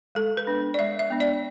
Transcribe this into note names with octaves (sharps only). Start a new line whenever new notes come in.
G#3 A4
B4
B3 D4
D5
G#3 E5
E5
B3 D4
D5